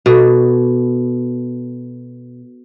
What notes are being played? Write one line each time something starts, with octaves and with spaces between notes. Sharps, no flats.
B2 F#4 A4